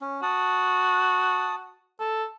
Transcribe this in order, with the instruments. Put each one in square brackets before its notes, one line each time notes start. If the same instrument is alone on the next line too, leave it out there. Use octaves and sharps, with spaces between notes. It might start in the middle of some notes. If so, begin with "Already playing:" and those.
[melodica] C#4
[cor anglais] F#4 [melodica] A5 D#6
[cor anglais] A4